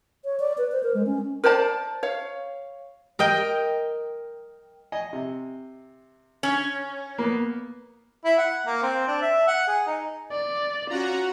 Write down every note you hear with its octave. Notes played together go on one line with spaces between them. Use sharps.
C#5
D5
B4
C5
A#4
G#3
C#4
A#4 C5 D5 A5
C#5 F5
A#4 D#5 G5
D#5 G#5
C3
C#4
A#3 B3
E4
F#5
A#3
C4
D4
E5
F#5
G#4
D#4
D5
C#4 F4 F#4 F#5 A#5